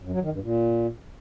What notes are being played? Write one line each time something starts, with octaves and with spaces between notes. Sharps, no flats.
F#2
F#3
D#3
G2
A#2